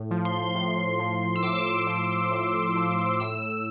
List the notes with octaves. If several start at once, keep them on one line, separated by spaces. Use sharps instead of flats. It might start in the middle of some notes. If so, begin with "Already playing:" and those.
Already playing: A2
F3
C6
A2
F3
E6
A2 D6
F3
A2
F3
A2 E6